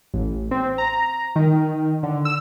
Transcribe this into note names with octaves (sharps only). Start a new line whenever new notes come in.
A1
C4
A#5
D#3
D3
E6